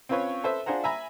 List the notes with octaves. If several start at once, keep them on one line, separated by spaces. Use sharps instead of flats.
C4 C#4 F4 B4 C#5
A4 B4 C5 E5
D4 F4 G#4 C5 F#5 A#5
E5 G#5 A#5 B5